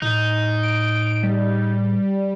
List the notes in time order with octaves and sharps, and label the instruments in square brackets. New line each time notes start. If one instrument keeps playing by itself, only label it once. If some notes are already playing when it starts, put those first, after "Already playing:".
[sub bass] A2 [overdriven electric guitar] D#4
[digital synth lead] D7
G3